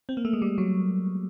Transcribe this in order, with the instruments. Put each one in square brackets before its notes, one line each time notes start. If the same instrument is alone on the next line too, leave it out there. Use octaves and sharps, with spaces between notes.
[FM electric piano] C4
A#3
A3
G#3
G3
F#3